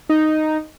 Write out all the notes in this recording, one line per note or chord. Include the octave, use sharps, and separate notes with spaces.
D#4